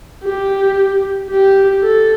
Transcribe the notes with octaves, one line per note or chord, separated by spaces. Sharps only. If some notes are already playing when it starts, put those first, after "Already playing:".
G4
G4
A4